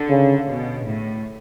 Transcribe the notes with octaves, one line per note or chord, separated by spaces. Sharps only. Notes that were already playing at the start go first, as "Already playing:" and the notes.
Already playing: D3
C#3
B2
A2